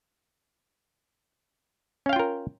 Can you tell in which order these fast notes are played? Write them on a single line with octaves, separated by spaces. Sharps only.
C#4 F5 G5 F4 A#4